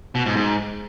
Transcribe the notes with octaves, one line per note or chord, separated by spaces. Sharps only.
B2
G#2
G#2